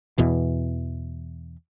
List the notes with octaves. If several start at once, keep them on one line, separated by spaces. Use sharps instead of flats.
E2 B2 E3